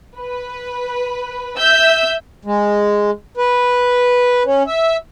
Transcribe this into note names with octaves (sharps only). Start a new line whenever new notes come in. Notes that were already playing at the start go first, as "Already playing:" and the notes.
B4
E5 E6 G6
G#3
B4
C#4
E5